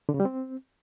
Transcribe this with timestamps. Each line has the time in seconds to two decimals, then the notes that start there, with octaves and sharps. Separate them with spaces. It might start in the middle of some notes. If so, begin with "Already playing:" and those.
0.09 D3
0.14 C#3
0.20 G3
0.25 C4